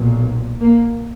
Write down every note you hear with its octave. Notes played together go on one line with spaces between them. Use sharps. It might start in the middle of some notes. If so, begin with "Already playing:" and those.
Already playing: B1 A#2
A#3